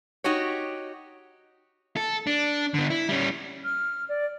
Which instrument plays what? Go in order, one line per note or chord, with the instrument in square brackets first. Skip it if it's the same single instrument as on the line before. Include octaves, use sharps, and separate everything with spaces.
[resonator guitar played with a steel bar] D#4 F#4 G4 C#5
[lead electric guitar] A4
D4
D3 B3
E4
G3 C#4
[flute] F6
D5